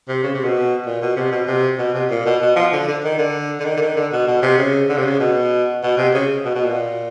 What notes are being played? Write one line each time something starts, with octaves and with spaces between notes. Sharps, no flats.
C3
C#3
C3
B2
A#2
B2
C3
B2
C3
B2
C3
A#2
B2
B2
F3
D3
D3
D#3
D3
D3
D#3
D3
D#3
D3
B2
B2
C3
C#3
D3
C3
C#3
B2
B2
C3
C#3
B2
B2
A#2